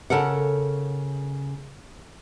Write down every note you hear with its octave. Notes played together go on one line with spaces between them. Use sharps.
C#3 A4 A#4 F#5